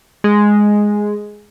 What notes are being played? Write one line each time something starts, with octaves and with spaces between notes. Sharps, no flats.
G#3